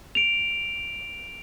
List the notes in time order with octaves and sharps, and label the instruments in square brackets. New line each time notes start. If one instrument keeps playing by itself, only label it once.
[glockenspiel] D7 F7